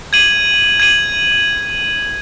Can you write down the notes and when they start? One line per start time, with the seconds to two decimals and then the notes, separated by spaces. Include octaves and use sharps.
0.13 G#6 D#7 F#7
0.80 G#6 D#7 F#7